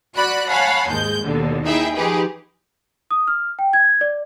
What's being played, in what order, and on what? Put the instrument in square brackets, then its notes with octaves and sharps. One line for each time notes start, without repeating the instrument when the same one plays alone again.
[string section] F#4 D5 B5 F#6
C#5 F5 F#5 G#5 A5 B5
D#2 G#2 G#3 G6
D#2 B2 D3
D#4 E4 G#4 E5 G5
F3 D#4 G4 G#4 B4
[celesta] D#6
F6
G5
G#6
D5